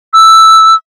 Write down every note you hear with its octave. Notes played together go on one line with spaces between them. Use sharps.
E6